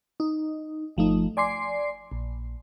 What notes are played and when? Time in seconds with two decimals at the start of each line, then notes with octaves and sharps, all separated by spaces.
0.20 D#4
0.97 G1 F3 A3 D#4
1.37 D5 G#5 C6 D6 C7
2.12 A#1